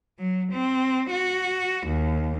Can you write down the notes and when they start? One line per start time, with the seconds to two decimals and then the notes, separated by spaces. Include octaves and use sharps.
0.19 F#3
0.52 C4
1.11 F#4
1.87 D#2